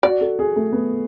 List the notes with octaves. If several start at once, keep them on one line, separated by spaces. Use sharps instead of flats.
F#4 D5
A4
G#4
A3
B3